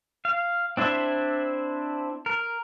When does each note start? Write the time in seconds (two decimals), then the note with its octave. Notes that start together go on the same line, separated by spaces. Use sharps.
0.25 F5
0.77 C4 D4 E4 C5 E5
2.26 A#4